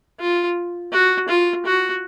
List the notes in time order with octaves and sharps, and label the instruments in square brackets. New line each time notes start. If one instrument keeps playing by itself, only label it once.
[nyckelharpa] F4
F#4
F4
F#4